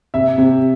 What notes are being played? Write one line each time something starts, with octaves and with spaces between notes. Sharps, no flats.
C3 E5
C3